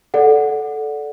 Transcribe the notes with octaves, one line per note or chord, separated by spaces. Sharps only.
A4 D5 F#5